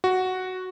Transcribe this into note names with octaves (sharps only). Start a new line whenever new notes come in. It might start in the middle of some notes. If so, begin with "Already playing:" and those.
F#4